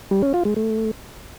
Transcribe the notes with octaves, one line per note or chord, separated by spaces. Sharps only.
G3
C#4
F4
G#3
A3